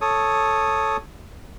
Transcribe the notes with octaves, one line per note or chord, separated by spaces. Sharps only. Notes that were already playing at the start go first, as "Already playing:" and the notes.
A4 C#5 D#6